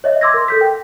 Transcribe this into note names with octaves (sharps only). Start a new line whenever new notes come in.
C#5 D#5 E5
C6 D6 E6 G#6 A#6
A#4
A4 G6 B6
G5